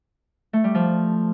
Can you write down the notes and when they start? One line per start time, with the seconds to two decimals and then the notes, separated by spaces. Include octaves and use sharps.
0.53 A3
0.64 G3
0.75 F3